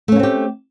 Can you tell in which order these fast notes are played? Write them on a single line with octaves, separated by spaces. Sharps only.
A3 C#4 A#3 C4 G4